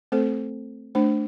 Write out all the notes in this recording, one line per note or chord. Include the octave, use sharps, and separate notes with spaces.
A3 C4 A4 C5
A3 D4 C5